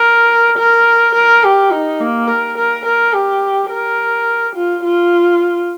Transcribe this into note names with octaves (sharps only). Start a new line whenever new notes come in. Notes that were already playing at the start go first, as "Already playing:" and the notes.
Already playing: A#4
A#4
A#4
G4
D#4
A#3
A#4
A#4
A#4
G4
A#4
F4
F4